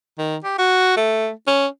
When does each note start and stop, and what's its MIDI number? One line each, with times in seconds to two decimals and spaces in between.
0.18 0.36 51
0.44 0.56 67
0.58 0.95 66
0.97 1.30 57
1.47 1.67 61